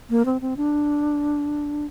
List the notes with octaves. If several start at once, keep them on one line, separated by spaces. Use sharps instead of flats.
A#3
C4
C4
D4